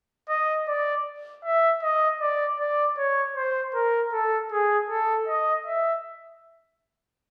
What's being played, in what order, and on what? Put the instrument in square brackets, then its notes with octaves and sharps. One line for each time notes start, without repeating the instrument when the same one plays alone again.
[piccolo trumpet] D#5
D5
E5
D#5
D5
D5
C#5
C5
A#4
A4
G#4
A4
D#5
E5